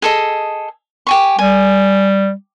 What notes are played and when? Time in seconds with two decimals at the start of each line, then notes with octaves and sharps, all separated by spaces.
0.02 G#4 A4 D#5
1.07 G4 G#5 C#6
1.39 G3 G#5